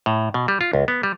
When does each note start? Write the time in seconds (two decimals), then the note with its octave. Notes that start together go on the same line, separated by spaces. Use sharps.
0.06 A2
0.34 B2
0.48 G3
0.61 F4
0.73 C#2
0.88 B3
1.03 G3